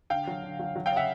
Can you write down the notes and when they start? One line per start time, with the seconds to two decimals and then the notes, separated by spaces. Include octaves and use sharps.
0.10 D3 F5 G5
0.27 F#3
0.43 D3
0.60 F#3
0.76 F#3
0.86 F5 G5
0.92 C#3 E5 F#5